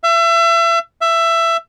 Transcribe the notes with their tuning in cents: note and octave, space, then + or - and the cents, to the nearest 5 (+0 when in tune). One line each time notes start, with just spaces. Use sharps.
E5 +30
E5 +15